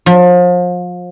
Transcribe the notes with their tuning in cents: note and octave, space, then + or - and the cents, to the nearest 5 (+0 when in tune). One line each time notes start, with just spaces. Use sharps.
F3 +35